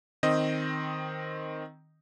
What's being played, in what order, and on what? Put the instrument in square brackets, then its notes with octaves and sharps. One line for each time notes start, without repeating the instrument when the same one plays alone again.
[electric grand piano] D#3 C4 D#5